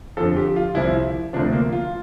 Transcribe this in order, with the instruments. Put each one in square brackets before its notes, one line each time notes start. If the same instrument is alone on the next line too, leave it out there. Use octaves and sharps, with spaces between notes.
[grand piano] F2 D3 F3 A4
G4
F4
C2 C3 F3 E4
D2 C3 F3 D4
A#3
F4